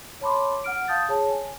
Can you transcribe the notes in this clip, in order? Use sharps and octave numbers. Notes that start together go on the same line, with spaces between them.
C#5 A5 B5 C6 D6
F#5 F6 D7
F5 A5 D#6 G6 A6
G#4 C#5 A5
G#5